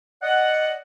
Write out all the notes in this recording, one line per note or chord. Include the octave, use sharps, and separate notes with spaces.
D5 D#5 F#5